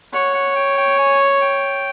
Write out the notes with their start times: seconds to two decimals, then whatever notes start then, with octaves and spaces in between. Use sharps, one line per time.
0.13 C#5 F#5
0.35 F#5
0.56 G5
0.78 G5
0.99 G#5
1.42 G5